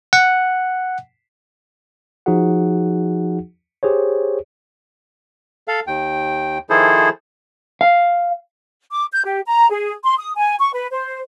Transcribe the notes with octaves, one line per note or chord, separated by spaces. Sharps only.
F#5
F3 D#4 F#4 G#4 F#5
G4 G#4 C5 C#5
A4 F5
D#2 G5
D#3 F3 E4 G#4 A4 C5
F5
D6
G6
G4
A#5
G#4
C6
D#6
G#5
C#6
B4
C5